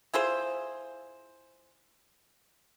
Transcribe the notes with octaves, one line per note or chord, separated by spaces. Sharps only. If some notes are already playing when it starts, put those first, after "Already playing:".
E4 F4 G#4 C5